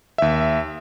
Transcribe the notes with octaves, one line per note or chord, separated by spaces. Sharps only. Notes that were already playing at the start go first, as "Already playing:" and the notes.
D#2 E5